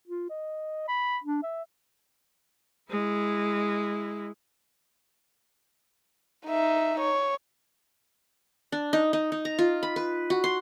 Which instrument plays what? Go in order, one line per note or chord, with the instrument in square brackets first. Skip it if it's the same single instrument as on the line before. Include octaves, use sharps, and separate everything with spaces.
[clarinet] F4
D#5
B5
D4
E5
[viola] G#3 E4
[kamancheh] D#4 E5
C#5
[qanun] D4
D#4
D#4
D#4
A#5
F4
B5
B4
F#4
C6